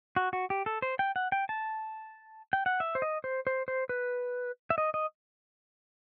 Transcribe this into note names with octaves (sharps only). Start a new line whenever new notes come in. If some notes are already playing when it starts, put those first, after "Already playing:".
F#4
F#4
G4
A4
C5
G5
F#5
G5
A5
G5
F#5
E5
C5
D#5
C5
C5
C5
B4
E5
D#5
D#5